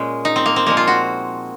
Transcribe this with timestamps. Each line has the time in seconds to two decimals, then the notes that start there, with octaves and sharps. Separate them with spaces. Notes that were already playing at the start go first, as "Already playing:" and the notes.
Already playing: A#2 G#3 C#4
0.25 D#4
0.36 C4
0.46 A#3
0.56 C4
0.66 A#2 F3 G#3 A#3
0.77 F4
0.87 F#4